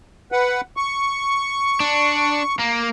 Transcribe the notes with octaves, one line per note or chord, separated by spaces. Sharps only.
B4 F#5
C#6
D4
A#3